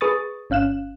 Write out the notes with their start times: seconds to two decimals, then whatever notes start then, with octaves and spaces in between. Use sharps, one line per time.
0.01 G#4 B4 C#6 D#6 A6
0.50 G1 C#4 F5 F#6 E7